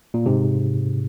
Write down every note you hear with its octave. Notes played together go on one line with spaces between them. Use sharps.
A#2
G#2 C3